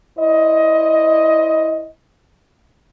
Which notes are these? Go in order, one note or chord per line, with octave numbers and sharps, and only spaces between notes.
E4 C5 D5 D#5